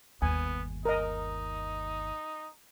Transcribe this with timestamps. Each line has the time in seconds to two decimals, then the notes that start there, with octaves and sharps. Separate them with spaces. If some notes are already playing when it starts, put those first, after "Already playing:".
0.22 G1 D#2 B3 G#5
0.85 D#4 A#4 D#5